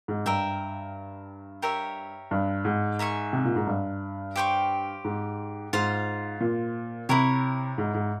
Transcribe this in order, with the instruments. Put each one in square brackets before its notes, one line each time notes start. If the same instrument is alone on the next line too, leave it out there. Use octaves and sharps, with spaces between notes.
[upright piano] G#2
[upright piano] G2 [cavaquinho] A#4 E5 G5
[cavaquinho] G4 A#4 C#5 E5
[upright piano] G2
G#2
[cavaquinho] A#4 E5 G#5 C#6
[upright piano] C3
A#2
G#2
G2
[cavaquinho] G4 C5 G5 C#6
[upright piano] G#2
[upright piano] G#2 [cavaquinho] F4 C5 F5
[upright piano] A#2
[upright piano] C3 [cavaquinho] E4 A#4 C#5
[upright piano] G#2
G#2